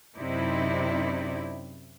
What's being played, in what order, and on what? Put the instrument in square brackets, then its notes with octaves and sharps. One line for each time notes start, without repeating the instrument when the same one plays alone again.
[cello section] F#2 C3 C4 D#4 E4 D5